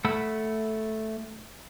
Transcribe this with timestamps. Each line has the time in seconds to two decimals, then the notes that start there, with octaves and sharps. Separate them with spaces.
0.05 A3 F#5 B5 E6